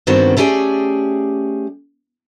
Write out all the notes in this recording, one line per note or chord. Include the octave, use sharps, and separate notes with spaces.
G2 D3 D#3 B3 C4 F#4
A3 B3 C#4 G4 G#4 D5